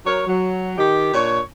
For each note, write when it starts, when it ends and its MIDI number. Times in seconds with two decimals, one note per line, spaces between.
0.06 0.22 54
0.06 0.22 70
0.06 0.22 73
0.27 0.74 54
0.78 1.13 51
0.78 1.13 67
1.14 1.40 46
1.14 1.40 62
1.14 1.40 73